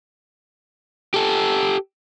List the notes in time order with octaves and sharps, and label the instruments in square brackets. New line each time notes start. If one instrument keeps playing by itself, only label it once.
[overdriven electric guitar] G4 A4